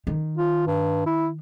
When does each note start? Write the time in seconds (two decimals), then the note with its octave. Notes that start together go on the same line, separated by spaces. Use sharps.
0.07 D#3
0.37 F4
0.66 G2
1.06 E4